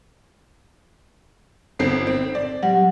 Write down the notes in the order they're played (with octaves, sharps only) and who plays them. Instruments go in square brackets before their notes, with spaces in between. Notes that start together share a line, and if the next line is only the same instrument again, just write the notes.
[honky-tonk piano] G1 C4 C7
C4
D5
[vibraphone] F#3 F#5 [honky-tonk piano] G3